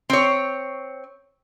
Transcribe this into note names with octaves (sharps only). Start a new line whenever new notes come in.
C4 C#5